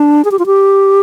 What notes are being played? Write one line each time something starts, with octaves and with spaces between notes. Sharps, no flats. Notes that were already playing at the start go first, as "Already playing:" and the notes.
Already playing: D4
G#4
G4
F4
G4